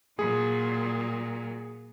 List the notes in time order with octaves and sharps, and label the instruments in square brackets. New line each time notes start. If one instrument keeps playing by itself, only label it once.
[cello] A#2 F#3 [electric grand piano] G#4